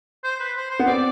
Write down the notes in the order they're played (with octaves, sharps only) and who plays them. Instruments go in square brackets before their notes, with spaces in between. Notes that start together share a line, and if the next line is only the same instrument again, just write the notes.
[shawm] C5
B4
C5
C5
[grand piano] B3
[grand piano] C4 [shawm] D5